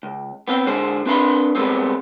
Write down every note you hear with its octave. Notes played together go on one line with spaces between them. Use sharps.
C#2
B3 C4 F5 G5
D3 G#3 C5
C4 D4 B4 F5 B5 C6
G3 G#3 B3 C4